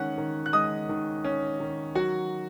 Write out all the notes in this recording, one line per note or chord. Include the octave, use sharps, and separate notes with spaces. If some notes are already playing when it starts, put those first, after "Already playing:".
Already playing: D#3 G#3 C#4 F#5 F#6
D#3
F#6
G#3 D#5 D#6
D#3
C#4
D#3
F#3 F#4 F#5